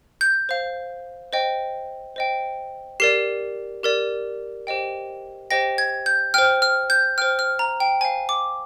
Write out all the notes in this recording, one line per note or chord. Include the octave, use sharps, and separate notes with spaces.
G6
C5 F5
C5 D#5 G5
C5 D#5 G5
G4 A#4 D5 C7
G4 A#4 D5
G4 C5 D#5 G5
G4 C5 D#5 G5 A#6
G#6
G6
C5 G5 F6
F6
G6
C5 G5 F6
F6
A#5
G5
C5 F5 G#5
D6